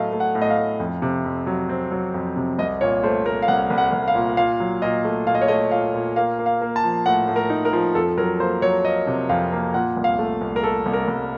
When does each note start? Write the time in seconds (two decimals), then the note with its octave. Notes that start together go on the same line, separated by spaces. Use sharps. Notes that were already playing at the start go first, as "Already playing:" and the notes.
Already playing: A2 F#3 A3 D#5 F5
0.13 A3
0.20 F#5
0.35 A2
0.41 D#5
0.50 F5
0.57 A2
0.80 F2
1.02 C3
1.25 F2
1.47 F#3
1.69 C4
1.91 F#3
2.14 F2
2.36 C3
2.59 C2 D#5
2.81 A#2 C#5
3.03 A3 C5
3.26 A3 A#4
3.42 F5
3.48 C2 F#5
3.70 C2
3.78 F#5
3.92 C2
4.08 F5
4.15 A#2
4.37 A#2 F5
4.60 F#3
4.82 A#2 D#5
5.05 A3
5.27 A#2 F5
5.35 D#5
5.41 C#5
5.48 A3 D#5
5.71 A#2 F5
5.94 A#2
6.16 A#3 F5
6.39 A#3
6.46 F5
6.61 A#3
6.76 A5
6.83 F3
7.06 A2 F#5
7.28 A2
7.36 A#4
7.50 D#4
7.65 A#4
7.73 F3
7.95 F2 A4
8.17 F#3 A#4
8.40 A#3 C5
8.62 F#3 C#5
8.85 A#3 D#5
9.07 C3
9.29 F2 F5
9.52 A#3
9.74 A#2 F#5
9.97 C2
10.04 F5
10.19 A3
10.41 C2
10.56 A#4
10.64 A3 A4
10.86 C2
10.93 A#4
11.08 C2